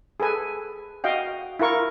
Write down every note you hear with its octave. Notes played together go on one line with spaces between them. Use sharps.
G#4 A4 B4 G#5
F#4 D#5 F5 G5
E4 F4 A#4 C#6